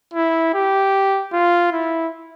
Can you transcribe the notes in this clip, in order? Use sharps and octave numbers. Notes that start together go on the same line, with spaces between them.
E4
G4
F4
E4